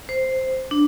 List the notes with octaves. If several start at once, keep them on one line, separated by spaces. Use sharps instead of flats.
C5
D4